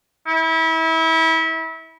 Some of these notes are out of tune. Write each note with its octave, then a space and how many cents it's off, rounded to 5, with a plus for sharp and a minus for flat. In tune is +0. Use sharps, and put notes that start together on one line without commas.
E4 -30